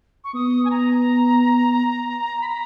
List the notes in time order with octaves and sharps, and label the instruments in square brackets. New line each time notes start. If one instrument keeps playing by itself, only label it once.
[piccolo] C#6
[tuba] B3 [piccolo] D#6
[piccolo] G#5
A#5
B5
A#5